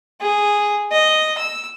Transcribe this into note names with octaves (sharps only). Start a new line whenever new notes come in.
G#4
D#5
E6